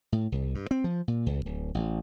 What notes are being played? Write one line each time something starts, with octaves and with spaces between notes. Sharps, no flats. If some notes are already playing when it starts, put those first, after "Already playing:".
A2
C2
G2
C4
F3
A#2
C#2
D1
A1